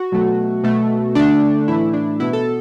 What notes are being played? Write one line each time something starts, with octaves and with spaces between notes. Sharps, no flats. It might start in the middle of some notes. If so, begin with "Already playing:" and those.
Already playing: F#4
B2 F#3 A3
B2 A3
D3 A3 D4
A2 E3 A3 E4
D4
B2 B3 E4
A4